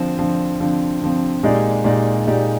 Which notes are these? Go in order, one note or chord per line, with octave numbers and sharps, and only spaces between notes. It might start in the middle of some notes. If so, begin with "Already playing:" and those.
Already playing: D3 F3 C4
D3 F3 C4
D3 F3 C4
D3 F3 C4
A#2 G#3 D#4 G4 D5
A#2 G#3 D#4 G4 D5
A#2 G#3 D#4 G4 D5